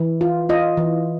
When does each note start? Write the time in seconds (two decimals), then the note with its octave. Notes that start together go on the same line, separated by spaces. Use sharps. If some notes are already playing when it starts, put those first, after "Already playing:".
Already playing: E3
0.21 F4
0.49 F4 D#5
0.77 E3